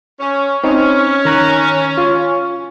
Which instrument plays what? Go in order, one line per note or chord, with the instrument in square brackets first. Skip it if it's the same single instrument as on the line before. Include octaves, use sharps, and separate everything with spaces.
[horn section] C#4
[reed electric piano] C4 D#4 [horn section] C#4
[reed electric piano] D#3 A#5 F#6
F4